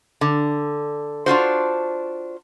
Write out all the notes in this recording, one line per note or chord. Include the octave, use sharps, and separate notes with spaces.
D3
D4 F4 F#4 C5